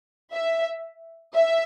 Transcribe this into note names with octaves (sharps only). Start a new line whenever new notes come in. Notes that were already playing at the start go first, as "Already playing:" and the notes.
E5
E5